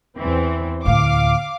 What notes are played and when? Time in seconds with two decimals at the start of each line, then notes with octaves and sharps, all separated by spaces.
0.16 E2 E3 C4
0.85 D2 A2 F5 D6